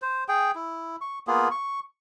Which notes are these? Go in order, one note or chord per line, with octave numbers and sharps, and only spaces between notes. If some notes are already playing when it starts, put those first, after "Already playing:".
C5
G#4 G5
E4
C#6
A#3 B3 F4 G#4
C#6